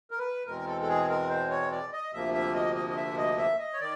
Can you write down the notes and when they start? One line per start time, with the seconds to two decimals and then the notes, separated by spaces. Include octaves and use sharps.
0.11 A#4
0.18 B4
0.46 E2 B2 G#3 C4 A#4
0.67 A4
0.82 A4
0.88 G#4
1.09 A#4
1.29 C5
1.50 C#5
1.71 D5
1.93 D#5
2.13 D2 C3 F3 A#3 E5
2.34 E5
2.55 D#5
2.76 D#5
2.90 D#5
2.97 E5
3.18 D#5
3.38 E5
3.59 D#5
3.73 C#5
3.80 D#3 D5